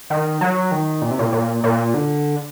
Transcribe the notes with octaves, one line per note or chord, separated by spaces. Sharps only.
D#3
F#3
D#3
A#2
C3
A#2
A#2
A#2
D3